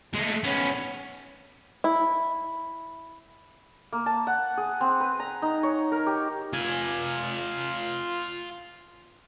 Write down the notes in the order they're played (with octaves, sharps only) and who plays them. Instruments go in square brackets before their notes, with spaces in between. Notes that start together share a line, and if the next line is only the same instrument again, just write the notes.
[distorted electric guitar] G#3 A3
B3 C#4
[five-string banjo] E4
[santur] A#3
A5
F#5
G#4
C4
B4
A#5
D#4
C#5
A#4
G4
[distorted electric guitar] F4 G#5